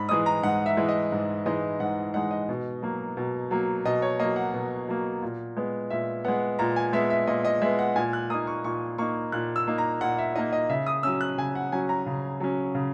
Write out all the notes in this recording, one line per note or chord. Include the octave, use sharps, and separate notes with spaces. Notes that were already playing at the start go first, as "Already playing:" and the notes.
Already playing: G#2 B5
E3 G#3 D#4 D#6
A#5
G#2 F#5
E5
E3 G#3 D#4
D#5
G#2
E3 G#3 D#4 D#5
G#2 F#5
E3 G#3 D#4 F#5
D#5
B2
F#3 A#3
B2
F#3 A#3
B2 D#5
C#5
F#3 A#3 D#5
F#5
B2
F#3 A#3
A#2
G#3 B3
A#2 E5
G#3 B3 F#5
A#2 A#5
G#5
G#3 B3 E5
E5
A#2 D#5
D#5
G#3 B3 E5
F#5
A#2 G#5
F#6
A#3 D#4 D#6
C#6
A#2 C#6
A#3 D#4 C#6
A#2 F#6
E6
A#3 D#4
A#5
A#2 F#5
E5
A#3 D#4 D#5
D#5
C#3 E5
D#6
F#3 C#4 E6
F#6
C#3 G#5
F#5
F#3 C#4 G#5
A#5
C#3
F#3 C#4
C#3